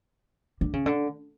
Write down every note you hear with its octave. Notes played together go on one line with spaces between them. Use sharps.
D3
C#3
D3